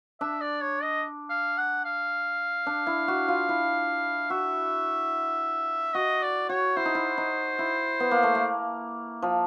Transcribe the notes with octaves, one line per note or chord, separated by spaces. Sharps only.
D4 E5
D5
C#5
D#5
F5
F#5
F5
D4
E4
F#4
F4
E4
F#4 E5
F#4 D#5
D5
F#4 C#5
E4 C5
D#4
E4
D#4
E4
B3
A#3
A3
A#3
F3